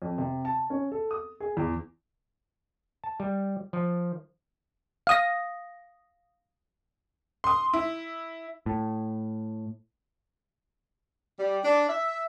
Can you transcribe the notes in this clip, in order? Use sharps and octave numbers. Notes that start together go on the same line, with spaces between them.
F2
C3
A5
C#4
A4
D#6
G#4
E2
A5
G3
F3
F5 D#6 A#6
C6 D#6
E4
A2
G3
D4
E5